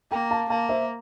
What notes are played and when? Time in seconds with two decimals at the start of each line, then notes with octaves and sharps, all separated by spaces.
0.11 A#3 G5 A#5
0.31 F5 A5
0.50 A#3 F5 A5
0.69 C5 E5